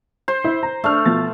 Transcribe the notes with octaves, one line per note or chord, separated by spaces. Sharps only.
C5
E4
A#5
A3 D4 F6
B2 F3 A6